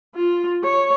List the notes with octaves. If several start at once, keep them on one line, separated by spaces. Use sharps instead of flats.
F4
C#5